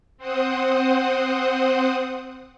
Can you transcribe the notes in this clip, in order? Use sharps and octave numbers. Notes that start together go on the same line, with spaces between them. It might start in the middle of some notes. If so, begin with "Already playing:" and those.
C4 C5 F#5 D#6